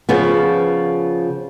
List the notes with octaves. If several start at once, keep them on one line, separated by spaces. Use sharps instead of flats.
C#3 F3 B3